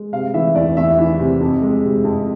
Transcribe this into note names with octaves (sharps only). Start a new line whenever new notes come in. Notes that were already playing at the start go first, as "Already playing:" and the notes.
Already playing: G#3
C3 F5
E3 E5
E2 D5
E2 E5
E3
C3
F2
G#3
C3
F2